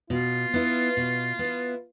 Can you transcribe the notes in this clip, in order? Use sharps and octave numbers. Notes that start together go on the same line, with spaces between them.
B2 F4
B3 E4
B2
B3
E4